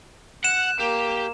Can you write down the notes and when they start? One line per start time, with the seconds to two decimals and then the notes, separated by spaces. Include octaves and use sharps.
0.44 F#5 F#6 E7
0.80 A#3 G4